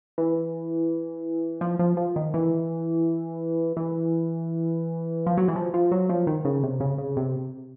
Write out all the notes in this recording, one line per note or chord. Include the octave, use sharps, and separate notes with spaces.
E3
F3
F3
F3
D#3
E3
E3
F3
F#3
E3
F3
F3
F#3
F3
D#3
C#3
C3
C#3
C#3
C3